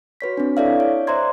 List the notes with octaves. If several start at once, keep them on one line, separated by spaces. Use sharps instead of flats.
F#4 B4 C#5 B6
C4 D4
E4 A4 C#5 D5 E5 F5
C#5
C5 D5 E5 A#5 C6 G#6